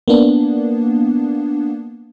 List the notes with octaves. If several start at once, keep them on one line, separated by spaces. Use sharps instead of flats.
A#3 B3 D4